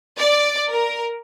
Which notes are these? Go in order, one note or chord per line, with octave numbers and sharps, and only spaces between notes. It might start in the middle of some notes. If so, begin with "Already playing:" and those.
D5
A#4